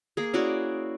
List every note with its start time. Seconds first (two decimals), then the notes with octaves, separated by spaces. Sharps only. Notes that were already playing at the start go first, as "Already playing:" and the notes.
0.17 A#3 G#4
0.34 C#4 E4 F#4 D5